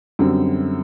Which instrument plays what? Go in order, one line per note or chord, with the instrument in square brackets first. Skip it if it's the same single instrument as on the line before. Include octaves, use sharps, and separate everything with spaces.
[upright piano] F#2 D3 G3 C4